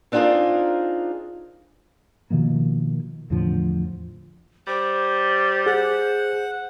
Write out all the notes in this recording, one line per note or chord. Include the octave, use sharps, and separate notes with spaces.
C4 D4 D#4 F4 G#4 A#4
B2 D#3 F3 A#3
E2 A2 D3 F3
G3 C5
G#4 F#5